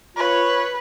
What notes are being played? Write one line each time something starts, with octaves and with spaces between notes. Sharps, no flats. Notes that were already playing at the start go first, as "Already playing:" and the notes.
F4 B4 C#5